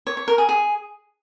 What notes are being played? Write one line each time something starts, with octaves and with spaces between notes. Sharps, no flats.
C#5
C#5
A#4
G#4
G#4